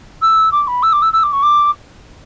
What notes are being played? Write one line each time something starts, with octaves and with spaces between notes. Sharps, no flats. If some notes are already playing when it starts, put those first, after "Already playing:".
E6
D6
B5
E6
D6
E6
E6
D6
C#6
D6